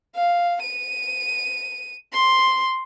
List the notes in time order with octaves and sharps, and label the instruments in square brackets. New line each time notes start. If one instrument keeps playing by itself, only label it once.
[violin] F5
D#7
C6